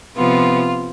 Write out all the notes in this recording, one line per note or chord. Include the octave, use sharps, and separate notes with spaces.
C3 F3 B3 F4